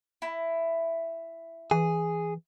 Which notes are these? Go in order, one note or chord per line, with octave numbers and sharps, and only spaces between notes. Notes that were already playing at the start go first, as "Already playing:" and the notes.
E4
E3 G#4